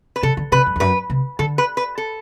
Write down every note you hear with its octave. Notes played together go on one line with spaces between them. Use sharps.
B4
C3 A4
D3
C3 B4
F#2
E2
F#2 B4
C3
D3 A4
B4
B4
A4